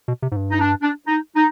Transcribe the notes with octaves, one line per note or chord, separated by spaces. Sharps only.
B2
C3
G#2
G2
D#4
D4
D4
D#4
D#4